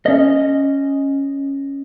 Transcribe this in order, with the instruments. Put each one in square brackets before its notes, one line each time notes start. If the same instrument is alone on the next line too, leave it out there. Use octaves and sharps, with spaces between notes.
[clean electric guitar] C#4 D#5